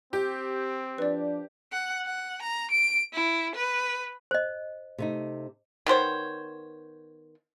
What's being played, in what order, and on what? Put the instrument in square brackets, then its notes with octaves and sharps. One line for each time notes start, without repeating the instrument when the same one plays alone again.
[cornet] C4 [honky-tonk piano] G4
[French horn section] F3 D4 [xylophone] B4 D5
[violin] F#5
F#5
A#5
D7
E4
B4
[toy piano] C5 D#5
[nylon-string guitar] C3 A3 D#4
[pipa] D#3 B3 C5 C#5